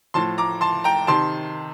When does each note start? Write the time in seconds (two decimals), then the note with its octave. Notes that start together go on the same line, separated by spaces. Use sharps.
0.14 A2 F3 A5 C6
0.38 A#5 D6
0.61 A5 C6
0.84 G5 A#5
1.07 C3 D#3 A5 C6